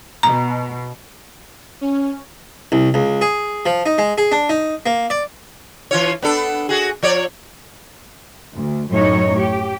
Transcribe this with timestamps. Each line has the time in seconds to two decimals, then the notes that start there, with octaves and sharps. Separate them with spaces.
0.23 B2 A#5
1.81 C#4
2.72 C2
2.94 C#2
3.21 G#4
3.66 F3
3.86 D#4
3.98 G#3
4.18 G#4
4.32 D4
4.49 D#4
4.86 A#3
5.10 D5
5.91 E3 F4 C#5
6.22 B3 D4 A4
6.69 F#4 G#4
7.03 F3 C#5 D5
8.56 D2
8.91 F#2 A2 D#4 C#5
9.37 G4